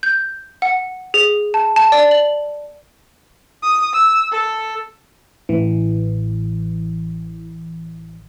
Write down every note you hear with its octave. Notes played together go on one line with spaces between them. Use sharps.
G6
F#5
G#4
A5
A5
D5
F#7
D#6
E6
A4
A1 E3